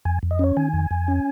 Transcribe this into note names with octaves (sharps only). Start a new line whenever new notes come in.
F2 G#5
F2
D#5
C#4 C#5
D#3 G#5
F2
F2
C#4